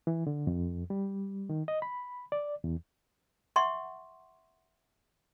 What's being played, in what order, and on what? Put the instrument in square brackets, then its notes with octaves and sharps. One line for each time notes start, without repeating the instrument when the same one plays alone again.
[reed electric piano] E3
D3
F2
G3
D#3
D#5
B5
D5
E2
[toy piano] E5 F#5 C6 C#6